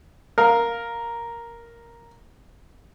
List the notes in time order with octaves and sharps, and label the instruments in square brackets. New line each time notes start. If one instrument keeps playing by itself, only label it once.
[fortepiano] A#4 F5